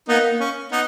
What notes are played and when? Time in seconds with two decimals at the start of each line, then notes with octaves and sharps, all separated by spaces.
0.08 A#3 B3 D#4
0.41 C#4
0.72 B3 D#4